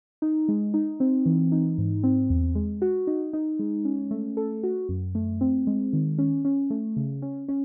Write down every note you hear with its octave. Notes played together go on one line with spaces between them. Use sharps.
D#4
G#3
D#4
C4
E3
D#4
G#2
C4
E2
G#3
F#4
D#4
D#4
G#3
C#4
A3
A4
F#4
F#2
A3
C4
G#3
D#3
C#4
C#4
A3
C#3
C#4
C#4